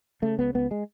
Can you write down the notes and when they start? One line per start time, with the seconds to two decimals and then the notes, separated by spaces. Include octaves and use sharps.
0.22 C#3 A3
0.39 C#2 B3
0.54 C#2 B3
0.71 G#3